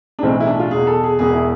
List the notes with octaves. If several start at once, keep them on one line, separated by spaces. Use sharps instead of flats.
D4
B1 A2 E3 C4
E4
D4
F4
E2 B2 G#4
A4
G#4
E1 E2 B2 G#4
E4